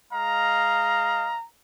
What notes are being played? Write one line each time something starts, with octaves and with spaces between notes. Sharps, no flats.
G#3 D#5 F5 A#5